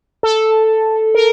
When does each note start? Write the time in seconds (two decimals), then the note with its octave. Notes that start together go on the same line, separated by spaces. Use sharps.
0.23 A4
1.15 A#4